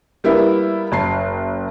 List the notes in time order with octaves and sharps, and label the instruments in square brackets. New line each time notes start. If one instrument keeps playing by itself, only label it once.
[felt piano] G3 A#3 B3 E4
F#1 A5 C7